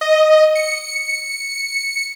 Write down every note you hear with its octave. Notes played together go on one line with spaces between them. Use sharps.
D#5
C#7